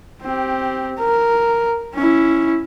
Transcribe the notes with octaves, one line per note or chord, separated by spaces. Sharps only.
C4 G4
A#4
C#4 E4